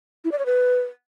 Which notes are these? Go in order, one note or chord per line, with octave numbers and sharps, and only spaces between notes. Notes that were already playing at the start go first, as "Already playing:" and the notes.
E4
D5
C#5
B4